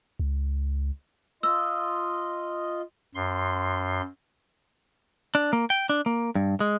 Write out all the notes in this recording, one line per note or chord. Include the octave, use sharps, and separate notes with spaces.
C#2
F4 D#5 E6
F#2 C6
D4
A#3
G5
D4
A#3
G2
G#3